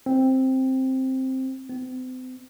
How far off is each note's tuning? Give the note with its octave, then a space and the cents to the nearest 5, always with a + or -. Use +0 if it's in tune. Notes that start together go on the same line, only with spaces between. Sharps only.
C4 +5
C4 -40